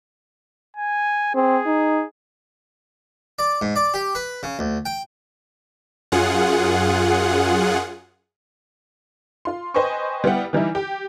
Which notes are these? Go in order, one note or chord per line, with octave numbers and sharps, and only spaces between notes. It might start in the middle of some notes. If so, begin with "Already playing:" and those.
G#5
C4 G#4
D#4
D5
G#2
D5
G4
B4
C#3
D2
G5
F#2 F4 G#4 F#5
F4 C6
B4 C5 D#5 G5 G#5 C#6
G3 B3 E4 F#5 G5
E3 G3 D#4 E4
G4